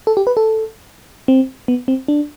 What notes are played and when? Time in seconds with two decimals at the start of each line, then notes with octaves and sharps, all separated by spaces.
0.07 A4
0.17 G4
0.27 B4
0.37 A4
1.28 C4
1.68 B3
1.88 C4
2.08 D4